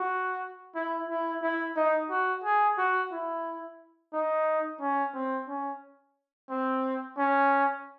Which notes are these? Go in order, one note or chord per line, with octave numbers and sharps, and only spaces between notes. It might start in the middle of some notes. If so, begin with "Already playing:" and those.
Already playing: F#4
E4
E4
E4
D#4
F#4
G#4
F#4
E4
D#4
C#4
C4
C#4
C4
C#4